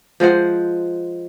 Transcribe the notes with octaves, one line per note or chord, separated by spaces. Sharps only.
F3 G#3 C5 F#5